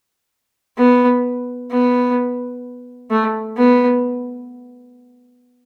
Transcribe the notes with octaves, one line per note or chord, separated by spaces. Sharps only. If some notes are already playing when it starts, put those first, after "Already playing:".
B3
B3
A3
B3